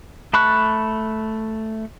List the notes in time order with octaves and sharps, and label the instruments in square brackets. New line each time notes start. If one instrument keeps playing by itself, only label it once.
[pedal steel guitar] A3 A5 B5 C#6 F#6